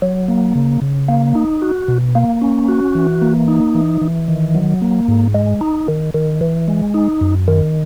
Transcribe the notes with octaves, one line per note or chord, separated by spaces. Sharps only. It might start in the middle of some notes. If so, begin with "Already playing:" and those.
F#3
A#3
C#3
C#3
A#3
D#4
F#4
B2
A#3
C#4
F#4
E3
A#3
D#4
E3
E3
D#3
F#3
A#3
G#2
G#3
D#4
D#3
D#3
E3
G#3
D#4
F#2
D#3